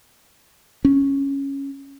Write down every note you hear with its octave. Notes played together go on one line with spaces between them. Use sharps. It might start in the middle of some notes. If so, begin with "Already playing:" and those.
C#4